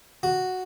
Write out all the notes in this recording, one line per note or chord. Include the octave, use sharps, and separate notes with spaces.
F#4